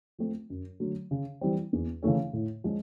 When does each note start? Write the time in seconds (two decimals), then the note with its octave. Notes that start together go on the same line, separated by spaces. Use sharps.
0.18 F3 A3 C4
0.50 F#2
0.80 D3 F#3 A3
1.11 C#3
1.41 E3 G3 C4
1.73 E2
2.03 C#3 E3 A3 C#4
2.33 A2
2.64 F3 G#3 C#4 F4